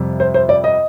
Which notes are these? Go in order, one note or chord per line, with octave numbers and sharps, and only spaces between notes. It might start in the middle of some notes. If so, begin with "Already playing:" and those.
Already playing: F2 C3 G3
C5
C5
D5
D#5